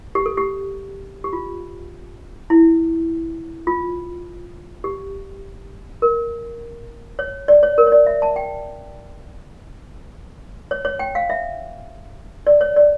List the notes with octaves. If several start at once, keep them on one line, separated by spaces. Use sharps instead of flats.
G4
A4
G4
G4
F4
E4
F4
G4
A#4
C#5
D5
C#5
A#4
C#5
D5
E5
A5
G5
C#5
C#5
G5
F5
E5
D5
C#5
D5